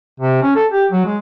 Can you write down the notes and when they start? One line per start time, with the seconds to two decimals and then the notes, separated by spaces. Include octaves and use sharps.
0.20 C3
0.43 C#4
0.55 A4
0.72 G4
0.91 F#3
1.06 G#3